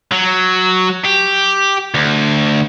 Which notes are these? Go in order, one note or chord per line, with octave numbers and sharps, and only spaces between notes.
F#3
G4
D2